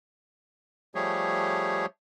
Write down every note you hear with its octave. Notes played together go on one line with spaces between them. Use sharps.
F3 G3 A3 G4 G#4 C#5